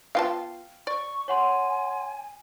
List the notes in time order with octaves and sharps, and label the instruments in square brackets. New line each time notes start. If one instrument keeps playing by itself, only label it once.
[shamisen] B3 F4 A5 [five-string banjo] F5 G5
[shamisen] D5 [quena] C#6
[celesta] C#5 F#5 C6 [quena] G#5